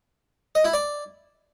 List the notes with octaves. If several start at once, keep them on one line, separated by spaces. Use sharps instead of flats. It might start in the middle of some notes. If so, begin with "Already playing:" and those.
D#5
E4
D5